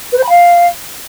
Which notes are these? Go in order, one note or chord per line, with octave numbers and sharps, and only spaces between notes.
B4
C5
B5
F5